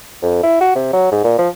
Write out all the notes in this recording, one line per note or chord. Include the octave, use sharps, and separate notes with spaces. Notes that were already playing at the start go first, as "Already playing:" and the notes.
F2
E4
F#4
C3
F#3
G#2
A#2
F3